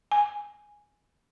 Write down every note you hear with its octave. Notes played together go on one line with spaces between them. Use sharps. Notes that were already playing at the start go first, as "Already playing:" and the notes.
G#5